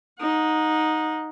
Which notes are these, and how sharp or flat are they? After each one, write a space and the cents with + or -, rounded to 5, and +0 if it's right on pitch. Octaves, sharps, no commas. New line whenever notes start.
D#4 +0 F#5 -30